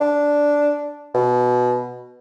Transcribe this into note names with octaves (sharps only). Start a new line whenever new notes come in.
D4
B2